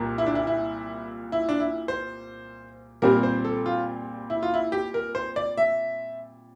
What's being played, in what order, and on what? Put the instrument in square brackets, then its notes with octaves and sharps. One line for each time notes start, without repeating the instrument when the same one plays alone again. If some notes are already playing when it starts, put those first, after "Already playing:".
Already playing: [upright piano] C2 A#2 A#3
[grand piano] E4
D4
E4
E4
E4
D4
E4
C5
[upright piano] A#2 G3 C4 [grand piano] A#4
[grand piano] C5
A4
F4
E4
F4
E4
G4
A#4
C5
D5
E5